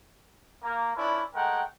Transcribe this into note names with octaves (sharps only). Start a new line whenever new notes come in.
A#3
C#4 D4 E4 F4 B4 D5
G#3 A3 A#4 F#5 G5